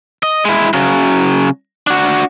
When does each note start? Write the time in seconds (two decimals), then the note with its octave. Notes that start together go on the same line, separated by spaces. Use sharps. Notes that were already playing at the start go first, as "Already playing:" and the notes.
0.23 D#5
0.45 G#3 E4
0.74 C#3 F#3
1.87 D4 F#4